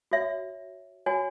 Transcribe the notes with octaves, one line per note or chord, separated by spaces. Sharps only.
F#4 C#5 E5
F#4 C#5 G#5